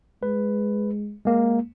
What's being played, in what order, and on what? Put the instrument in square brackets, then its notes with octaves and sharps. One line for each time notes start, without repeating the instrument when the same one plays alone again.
[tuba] G#3 [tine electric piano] B4
[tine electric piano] G#3 A#3